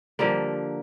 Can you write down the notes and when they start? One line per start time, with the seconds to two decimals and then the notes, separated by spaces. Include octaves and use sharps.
0.19 D3 F3 G3 A#3